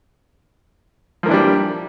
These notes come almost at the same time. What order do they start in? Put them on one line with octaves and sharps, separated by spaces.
F3 A#3 E3 D4 G3